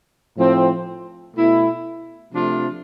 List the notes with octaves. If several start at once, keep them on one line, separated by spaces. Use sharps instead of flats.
A2 F3 C4
B2 A3 E4
C3 F3 A3 D4 F4